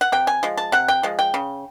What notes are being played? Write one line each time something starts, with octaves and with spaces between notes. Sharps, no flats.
F#5
C3 G5
G#5
F3 G#3
A5
C3 F#5
G5
F3 G#3
G5
C#3